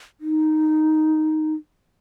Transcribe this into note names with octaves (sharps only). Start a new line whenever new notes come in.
D#4